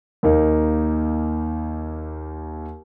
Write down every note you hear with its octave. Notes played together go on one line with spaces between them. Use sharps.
D#2 A#3 D#4